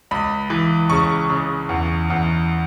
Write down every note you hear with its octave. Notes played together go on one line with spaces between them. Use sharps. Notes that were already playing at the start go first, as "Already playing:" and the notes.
C#2 B5
E3
C#3 C#6
C#3
E2
E2